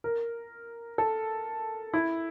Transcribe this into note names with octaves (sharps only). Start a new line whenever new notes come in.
A#4
A4
E4